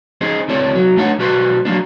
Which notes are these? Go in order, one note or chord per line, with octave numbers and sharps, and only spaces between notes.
C#4 D#4 G#4 C5
C#2 C4 E4 A4 C#5 D5
C2 F#3
A3 D4 D#4 C#5 F#5
B1 G3 F#4 B4 C5 C6
F#3 A3 A#3 D4